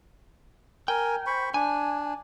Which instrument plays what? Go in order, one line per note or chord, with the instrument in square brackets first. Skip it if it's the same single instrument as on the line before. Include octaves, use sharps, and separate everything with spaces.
[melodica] A#4 G#5 [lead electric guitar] G5
[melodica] C5 B5 C#6
[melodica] D4 [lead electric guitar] G#5